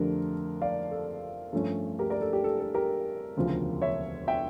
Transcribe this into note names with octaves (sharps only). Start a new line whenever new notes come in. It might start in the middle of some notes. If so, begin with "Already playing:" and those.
Already playing: F2 D3 A3 D4 G4 A#4
D5 F5
A4
G2 F3 A3 C#4 A4
G4 A#4
A#4 D5
A4
G4
A4
A4
G4 A#4
E1 D2 C#3 F3
C#5 E5
E5 G5